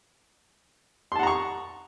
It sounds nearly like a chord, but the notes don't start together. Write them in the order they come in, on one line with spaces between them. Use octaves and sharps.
C6 A5 F#5 A#5 C#6